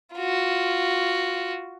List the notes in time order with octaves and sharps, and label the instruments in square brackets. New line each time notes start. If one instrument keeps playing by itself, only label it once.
[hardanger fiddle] F4 F#4